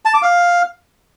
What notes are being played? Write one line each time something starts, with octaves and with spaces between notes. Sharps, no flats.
A5
D6
F5